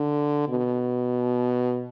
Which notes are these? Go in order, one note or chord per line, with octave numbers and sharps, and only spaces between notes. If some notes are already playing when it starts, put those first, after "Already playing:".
Already playing: D3
B2